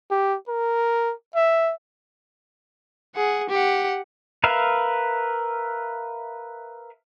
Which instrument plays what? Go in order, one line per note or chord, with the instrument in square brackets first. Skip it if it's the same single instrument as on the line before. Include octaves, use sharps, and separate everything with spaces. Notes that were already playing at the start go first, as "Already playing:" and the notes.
[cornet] G4
A#4
E5
[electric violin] G#4 F#5
G4 F#5
[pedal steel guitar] A#4 B4 E5 F5